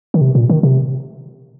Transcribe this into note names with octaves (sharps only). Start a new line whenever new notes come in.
D#3
C3
A#2
D#3
C3